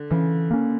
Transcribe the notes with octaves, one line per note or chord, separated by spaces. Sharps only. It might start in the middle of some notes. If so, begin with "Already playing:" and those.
Already playing: D3
C#3 E3
A#3 C#4